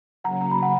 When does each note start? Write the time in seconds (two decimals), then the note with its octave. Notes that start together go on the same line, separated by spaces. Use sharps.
0.24 C#3 F#3 A#3 F#5 A#5
0.41 A#5
0.51 B5
0.62 F#5 A#5